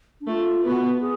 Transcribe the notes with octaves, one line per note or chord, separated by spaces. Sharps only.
D4
A3 F4
B3 F#4
G#4